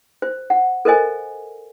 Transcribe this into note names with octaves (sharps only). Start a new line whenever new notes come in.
C5
F#5
A4 A#4 C5 D#5 G#5